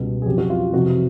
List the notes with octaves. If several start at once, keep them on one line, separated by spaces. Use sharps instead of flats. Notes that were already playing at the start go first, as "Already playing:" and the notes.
Already playing: C#2 B2 G3
G#4
F2 C#3 F#3 G4
F#4
F4
F2 C3 E3 F#4